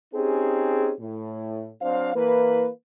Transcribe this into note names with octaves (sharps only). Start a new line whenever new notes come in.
C4 C#4 D#4 G4 G#4
A2
F#3 C4 D4 C5 F5
E3 A#3 B4